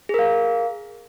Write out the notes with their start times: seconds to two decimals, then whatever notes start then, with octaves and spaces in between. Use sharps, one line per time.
0.09 G#4
0.14 A#4
0.19 F5